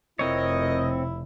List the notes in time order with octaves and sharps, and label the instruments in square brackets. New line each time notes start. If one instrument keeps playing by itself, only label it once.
[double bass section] F1 [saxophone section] F2 A#4 D#5 [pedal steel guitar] C4 C#5 [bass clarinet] E4